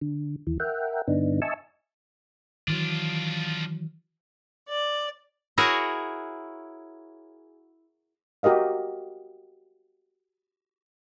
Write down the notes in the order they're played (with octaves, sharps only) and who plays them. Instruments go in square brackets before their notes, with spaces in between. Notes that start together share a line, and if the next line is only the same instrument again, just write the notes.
[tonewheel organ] D3
D#2 E3
A#4 E5 F#5 G5
G2 D3 B3 D4 D#4
D#5 E5 G#5 A5 C#6 E6
[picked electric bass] D#3 E3 F#3 [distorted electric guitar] D4 F4
[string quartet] D5
[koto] E4 F#4 G#4 A#4 C#5
[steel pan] F#4 G4 A#4 D#5 F5